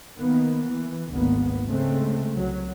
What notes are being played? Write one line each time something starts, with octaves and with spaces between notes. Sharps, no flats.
D#3 A#3 B3
E3
G#1 D2 G#2 A#3 B3
C#3 G#3 A3 C4
C2 F#3